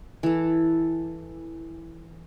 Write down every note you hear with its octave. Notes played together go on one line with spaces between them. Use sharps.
E3 A4